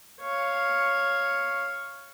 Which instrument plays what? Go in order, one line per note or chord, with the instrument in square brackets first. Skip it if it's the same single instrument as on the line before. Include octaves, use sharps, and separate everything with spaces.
[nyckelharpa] C#5 F5